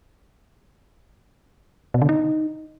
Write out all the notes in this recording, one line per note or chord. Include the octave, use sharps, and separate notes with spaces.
B2
D3
D#4